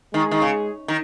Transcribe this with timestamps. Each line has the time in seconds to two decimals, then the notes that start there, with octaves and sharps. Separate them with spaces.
0.13 D#3 G#3 G#4
0.31 D#3
0.42 C#3
0.88 D#3